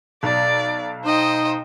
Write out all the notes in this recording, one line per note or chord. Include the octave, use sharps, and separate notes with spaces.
B1 D5
D#4 C5 D#5 G5